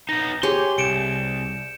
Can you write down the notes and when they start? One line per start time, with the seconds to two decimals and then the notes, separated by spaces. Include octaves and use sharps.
0.09 B3 D#4 A#6
0.43 G4 G#4 C#5 G#5 C6 G6
0.78 C2 C#7 D7 E7